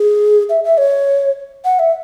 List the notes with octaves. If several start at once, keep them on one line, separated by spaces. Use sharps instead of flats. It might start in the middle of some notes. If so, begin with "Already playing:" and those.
Already playing: G#4
E5
E5
C#5
F#5
E5